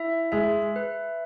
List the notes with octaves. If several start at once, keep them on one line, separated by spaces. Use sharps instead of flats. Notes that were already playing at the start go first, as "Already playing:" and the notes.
Already playing: E4 E5
G#3 E5
B4